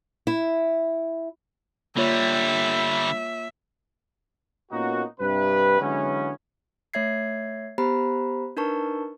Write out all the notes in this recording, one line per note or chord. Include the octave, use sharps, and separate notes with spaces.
E4
D3 G3 A#3 F4 C#5 E5
A#2 A#3 B3 C#4 D#4 F#4
G2 C3 B4
D3 E3 F#3 G#3 B3 C#4
A3 C#5 E5 G#6 C7
B3 G4 C5 A#5 B5
D4 D#4 A#4 B4 A5 C#6